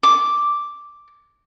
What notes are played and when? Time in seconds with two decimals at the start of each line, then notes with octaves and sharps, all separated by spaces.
0.03 D6